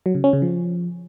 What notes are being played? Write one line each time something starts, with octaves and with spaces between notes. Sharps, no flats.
F#3
C#3
C#4
C#3
F3